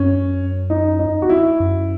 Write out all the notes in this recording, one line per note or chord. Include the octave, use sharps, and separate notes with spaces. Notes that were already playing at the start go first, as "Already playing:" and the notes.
Already playing: F#2 C#4
D#4
D#4
F#4
E4
F#2